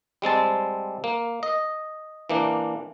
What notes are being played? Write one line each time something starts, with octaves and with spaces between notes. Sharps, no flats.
G3 G#3 C4 A5
A#3
D#5
E3 A#3 D4